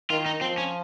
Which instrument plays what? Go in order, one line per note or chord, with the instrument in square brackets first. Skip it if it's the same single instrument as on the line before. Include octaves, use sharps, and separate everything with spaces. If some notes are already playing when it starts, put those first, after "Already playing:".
[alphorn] D#3 [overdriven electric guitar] F4
[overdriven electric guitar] D#4
[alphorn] F3 [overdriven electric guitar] C4
[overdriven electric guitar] C#4